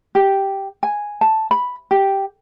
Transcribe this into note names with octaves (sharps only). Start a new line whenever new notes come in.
G4
G#5
A5
B5
G4